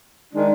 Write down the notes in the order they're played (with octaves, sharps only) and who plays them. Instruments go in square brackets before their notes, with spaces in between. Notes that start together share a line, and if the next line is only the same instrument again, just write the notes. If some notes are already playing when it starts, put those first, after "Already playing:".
[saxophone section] D#3 G#3 D4